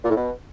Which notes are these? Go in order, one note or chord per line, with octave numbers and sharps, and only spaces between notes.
A#2
A2
B2